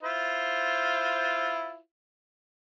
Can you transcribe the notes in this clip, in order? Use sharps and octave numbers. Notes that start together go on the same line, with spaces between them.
E4 F4 C5